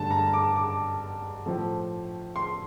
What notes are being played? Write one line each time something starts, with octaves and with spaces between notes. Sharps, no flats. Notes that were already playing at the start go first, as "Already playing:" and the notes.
Already playing: G2 D3 A3 A5
A#5
D6
D6
A2 F3 A3
C6